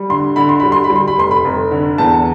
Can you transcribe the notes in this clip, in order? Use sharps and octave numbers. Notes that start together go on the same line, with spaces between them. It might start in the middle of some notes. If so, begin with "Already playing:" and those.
Already playing: G3
D3 C6
D3 B5
C6
G3 B5
C6
B5
G3
C6
B5
F1 C6
B5
F1
D3
E2 A5